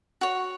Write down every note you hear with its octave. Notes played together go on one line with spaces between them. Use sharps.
F#4 C#5